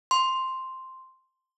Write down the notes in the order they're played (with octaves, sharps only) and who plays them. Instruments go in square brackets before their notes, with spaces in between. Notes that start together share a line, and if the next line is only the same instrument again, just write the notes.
[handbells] C6